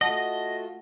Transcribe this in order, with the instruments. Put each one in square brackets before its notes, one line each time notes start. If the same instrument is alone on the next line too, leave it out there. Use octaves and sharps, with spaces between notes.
[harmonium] A3 F4 F#4 [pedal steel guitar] D#5 [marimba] F#5 A5